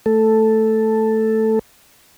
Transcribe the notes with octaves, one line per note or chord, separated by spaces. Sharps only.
A3 A4